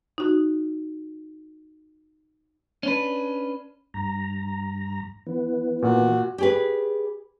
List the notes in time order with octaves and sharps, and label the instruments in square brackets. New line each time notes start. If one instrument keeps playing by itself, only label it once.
[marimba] D#4 F#4
[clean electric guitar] C#4 D4 B4
[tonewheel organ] G2 A#5
E3 B3
[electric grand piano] A#2 [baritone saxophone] F#4
[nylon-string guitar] G4 G#4 B4